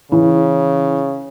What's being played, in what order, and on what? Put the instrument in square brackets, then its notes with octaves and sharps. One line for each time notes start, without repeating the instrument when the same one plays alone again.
[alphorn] C#3 [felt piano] E3